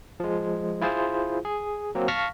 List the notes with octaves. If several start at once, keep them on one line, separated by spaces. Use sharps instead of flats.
F3 G#3
E4 F4 G#4 C5
G#4
F#3 A#3 C4
F5 A5 C#6 F6 A#6 B6